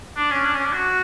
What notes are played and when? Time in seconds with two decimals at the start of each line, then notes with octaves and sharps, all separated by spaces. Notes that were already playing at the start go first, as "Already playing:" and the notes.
0.16 D4
0.30 C#4
0.45 D4
0.54 C#4
0.64 D4
0.73 F#4